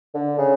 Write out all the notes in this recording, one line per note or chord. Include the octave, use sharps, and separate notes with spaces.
D3
C#3